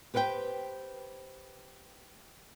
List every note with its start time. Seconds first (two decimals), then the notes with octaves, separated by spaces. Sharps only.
0.14 G4 B4 C5 F5 G5